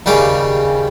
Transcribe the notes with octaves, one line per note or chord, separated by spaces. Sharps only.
D#2 C#3 G3 G#4 D6